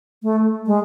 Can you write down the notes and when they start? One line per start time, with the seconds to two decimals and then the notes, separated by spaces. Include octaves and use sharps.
0.23 A3
0.66 G#3